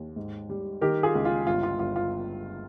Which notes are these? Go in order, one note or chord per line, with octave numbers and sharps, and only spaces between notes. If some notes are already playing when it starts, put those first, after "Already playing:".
Already playing: D#2
G#2
G3
D#3 G4 A#4
F4 G#4
C#2
F4
G1 F4
F4
G1 F4
F4